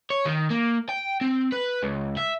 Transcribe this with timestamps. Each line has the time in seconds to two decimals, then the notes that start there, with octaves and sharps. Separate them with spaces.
0.10 C#5
0.25 D#3
0.50 A#3
0.89 G5
1.21 C4
1.52 B4
1.83 C#2
2.17 E5